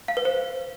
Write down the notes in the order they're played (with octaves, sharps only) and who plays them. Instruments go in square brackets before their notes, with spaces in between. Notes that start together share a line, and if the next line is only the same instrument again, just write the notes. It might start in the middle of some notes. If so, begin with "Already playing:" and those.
[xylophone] F5
B4
C5